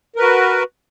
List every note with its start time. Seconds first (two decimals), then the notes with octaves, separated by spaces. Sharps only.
0.16 A#4
0.19 B4
0.22 F#4